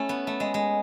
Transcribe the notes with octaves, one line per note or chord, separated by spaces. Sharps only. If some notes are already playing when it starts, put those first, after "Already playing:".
Already playing: A3 C#4 E4
B3
A3
G#3
G#3